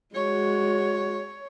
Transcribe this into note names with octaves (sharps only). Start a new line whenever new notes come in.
G#3 F#4 C#5